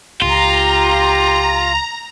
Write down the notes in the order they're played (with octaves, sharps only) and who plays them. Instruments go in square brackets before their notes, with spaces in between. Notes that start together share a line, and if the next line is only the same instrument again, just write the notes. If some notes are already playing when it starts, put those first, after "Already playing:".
[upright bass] C#2 [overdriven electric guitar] F4 [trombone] G4 [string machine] A#5